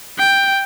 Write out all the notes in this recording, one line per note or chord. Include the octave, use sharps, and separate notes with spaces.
G5